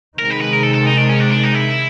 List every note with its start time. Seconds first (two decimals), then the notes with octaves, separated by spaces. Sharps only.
0.18 C3 D#3 G#3 A#4
0.30 B4
0.41 B4
0.53 A#4
0.63 A4
0.74 A4
0.86 D#4
0.97 D4
1.09 C#4
1.20 D4
1.31 D4
1.43 D#4
1.54 E4